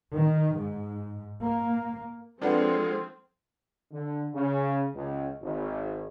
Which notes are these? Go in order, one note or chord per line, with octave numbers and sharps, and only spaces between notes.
D#3
G#2
A#3
F3 G#3 C4 D4 F4 A4 B4 F#5
D3
C#3
C#2
G#1